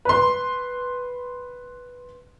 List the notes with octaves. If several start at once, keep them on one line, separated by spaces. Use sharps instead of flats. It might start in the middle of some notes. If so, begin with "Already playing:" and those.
B4 C6